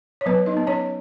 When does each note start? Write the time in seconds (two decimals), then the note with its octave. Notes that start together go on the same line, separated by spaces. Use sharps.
0.21 C#5
0.26 F#3 B3 B4
0.46 D#4 D#5
0.57 B3
0.67 C#4 C#5